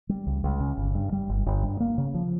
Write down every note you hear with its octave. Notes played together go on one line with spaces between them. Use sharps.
G3
C#2
C#2
C#3
G1
G2
G3
G1
G1
G2
A#3
C#3
F3